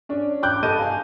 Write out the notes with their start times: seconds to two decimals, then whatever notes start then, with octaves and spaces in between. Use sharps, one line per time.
0.09 C#4 D4
0.43 G5 D6 F#6 G6
0.63 G2 A4 D#5 A5 G6 D#7
0.78 F5 G#5